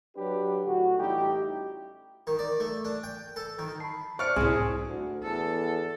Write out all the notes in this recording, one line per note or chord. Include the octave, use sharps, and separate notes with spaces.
F#3 D4 G4 B4
A2 D3 F#4
A1 G3 D#4 E4 G4
D#3
D5
A3
D4
G5
A4
D#3
A5 B5 C7
C5 D5 E5 C#6 F6 F#6 C#7
C2 A2 C4 E4 G#4 G#5
D2
E2 A4